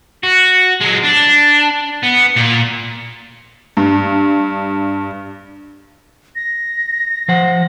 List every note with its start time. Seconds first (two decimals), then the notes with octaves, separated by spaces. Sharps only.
0.23 F#4
0.81 F#3 G#3
1.04 D4
2.03 B3
2.36 A#2 D5
3.77 G2
6.36 A#6
7.28 F3 C5 F#5